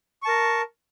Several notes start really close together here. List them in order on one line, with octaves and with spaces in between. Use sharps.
C#6 A5 A#4